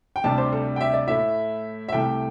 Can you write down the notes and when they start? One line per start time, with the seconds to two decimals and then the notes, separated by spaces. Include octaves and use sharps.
0.16 G5
0.24 D2 C3 G3 D4 A5
0.38 C5
0.53 A4
0.76 G5
0.81 E5
0.94 D5
1.08 A2 A3 E4 E5
1.89 E5
1.92 C2 C3 A3 G5